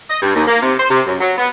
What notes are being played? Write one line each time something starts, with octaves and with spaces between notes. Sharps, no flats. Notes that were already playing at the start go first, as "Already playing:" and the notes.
D#5
G2
D#2
A#3
C3
C5
C3
F#2
F#3
B3